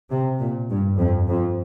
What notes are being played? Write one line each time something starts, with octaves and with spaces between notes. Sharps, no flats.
C3
A#2
G2
F2
F2